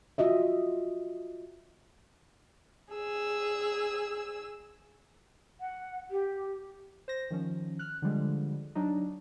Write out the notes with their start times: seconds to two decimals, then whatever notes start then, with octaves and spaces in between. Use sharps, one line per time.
0.18 F4 F#4 D#5 E5
2.93 G#4 E6
5.61 F#5
6.11 G4
7.08 C5 A#6
7.30 D#3 F3 C#4
7.79 F6 F#6
8.02 D3 F3 G3 G#3
8.75 F#3 D4 D#4